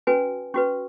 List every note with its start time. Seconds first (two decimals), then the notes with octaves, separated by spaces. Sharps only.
0.07 C#4 F#4 B4 G#5
0.54 C#4 F#4 B4 C#6